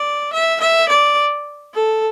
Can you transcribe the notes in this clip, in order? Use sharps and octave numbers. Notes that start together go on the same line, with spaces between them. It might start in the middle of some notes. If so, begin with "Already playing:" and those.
Already playing: D5
E5
E5
D5
A4